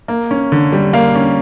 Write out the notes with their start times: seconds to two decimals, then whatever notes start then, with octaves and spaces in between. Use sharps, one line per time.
0.08 A#3
0.31 C#4
0.52 D3
0.73 G3
0.93 A#3 F5
1.16 C#4